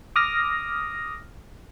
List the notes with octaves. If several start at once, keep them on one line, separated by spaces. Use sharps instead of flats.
D6 D#6 F6 A#6